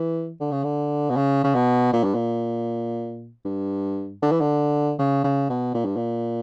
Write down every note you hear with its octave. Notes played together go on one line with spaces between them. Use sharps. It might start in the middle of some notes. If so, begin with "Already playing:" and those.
Already playing: E3
D3
C#3
D3
B2
C#3
C#3
B2
A#2
G2
A#2
G2
D3
E3
D3
C#3
C#3
B2
A#2
G2
A#2